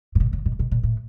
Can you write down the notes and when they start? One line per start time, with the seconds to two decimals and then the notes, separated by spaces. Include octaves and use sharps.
0.15 A#2
0.20 B2
0.33 C#3
0.46 B2
0.59 B2
0.71 A#2
0.83 A2